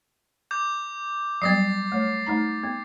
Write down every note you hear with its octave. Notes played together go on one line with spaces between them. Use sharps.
D6 G6
F#3 G3 B3 A6 A#6 C7
A3 C#5
A3 D#4 A#5
B3